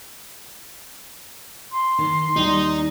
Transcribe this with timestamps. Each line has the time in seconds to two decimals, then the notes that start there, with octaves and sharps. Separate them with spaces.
1.71 C6
1.99 D#3
2.36 D#2 G3 D#4 G4